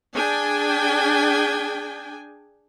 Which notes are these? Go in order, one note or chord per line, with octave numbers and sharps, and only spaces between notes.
D4 G#4 G5 G#5